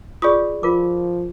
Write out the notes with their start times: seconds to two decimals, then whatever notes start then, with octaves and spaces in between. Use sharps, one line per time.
0.22 F4 G#4 D5 C#6 D#6
0.63 F3 F4 A#4 D6